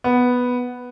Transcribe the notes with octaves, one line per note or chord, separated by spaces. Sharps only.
B3